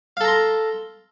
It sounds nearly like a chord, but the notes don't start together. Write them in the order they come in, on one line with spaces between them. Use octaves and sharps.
F5 A4 A#5 C6